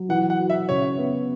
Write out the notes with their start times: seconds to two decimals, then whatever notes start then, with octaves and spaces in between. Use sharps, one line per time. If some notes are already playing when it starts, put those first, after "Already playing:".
Already playing: F#3
0.09 E3 F#5
0.30 F#5
0.39 F#4
0.50 E5
0.69 C#3 C#5
0.99 B3